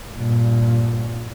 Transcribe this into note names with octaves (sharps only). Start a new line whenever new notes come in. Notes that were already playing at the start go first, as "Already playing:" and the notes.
G2 A#2